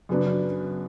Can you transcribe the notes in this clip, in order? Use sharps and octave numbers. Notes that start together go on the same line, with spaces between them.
F#2 C#3 F#3 B3 D4